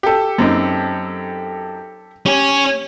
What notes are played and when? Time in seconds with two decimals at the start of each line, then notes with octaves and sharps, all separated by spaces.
0.03 G4 A4
0.38 F#2 C4 D#4
2.26 C#4 G4